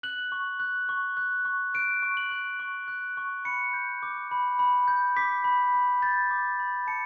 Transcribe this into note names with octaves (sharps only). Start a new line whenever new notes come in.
F#6 F#7
C#6
F#6
C#6
F#6
C#6
F#6 D7
C#6
F#7
F#6
C#6
F#6
C#6
B5 C#7
G6
D6
B5
B5
G6
D6 B6
B5
B5
G6 A6
D6
B5
A5 C#7